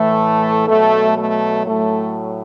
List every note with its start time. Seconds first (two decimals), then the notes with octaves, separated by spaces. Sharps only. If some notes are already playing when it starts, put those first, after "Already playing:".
Already playing: A2 E3 A3
0.68 B2 F#3 A3
1.17 A3
1.66 A2 F#3 A3